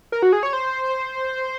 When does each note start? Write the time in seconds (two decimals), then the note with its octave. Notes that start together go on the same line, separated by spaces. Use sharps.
0.12 A#4
0.22 F#4
0.33 G#4
0.43 C#5
0.53 C5